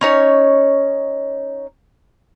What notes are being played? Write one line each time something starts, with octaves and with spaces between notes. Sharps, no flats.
C#4 D#4 C#5